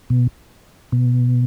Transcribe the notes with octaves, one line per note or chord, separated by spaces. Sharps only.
B2
B2